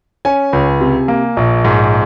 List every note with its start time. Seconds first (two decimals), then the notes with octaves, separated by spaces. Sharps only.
0.25 C#4 G#5
0.53 C#2
0.81 C3
1.08 A#3
1.37 A#1
1.64 G#2